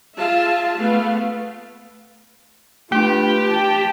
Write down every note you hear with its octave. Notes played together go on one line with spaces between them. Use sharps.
F4 G#4 E5 F5 A5
A3 B3 F5
A3 D4 F4 G4 B4
G5 A5